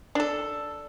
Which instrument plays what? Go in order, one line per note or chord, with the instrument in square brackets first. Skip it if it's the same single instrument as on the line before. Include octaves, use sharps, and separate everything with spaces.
[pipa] D4 A4